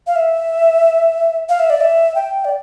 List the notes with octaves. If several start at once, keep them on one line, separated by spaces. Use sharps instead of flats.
F5
E5
F5
E5
D5
E5
G5
D5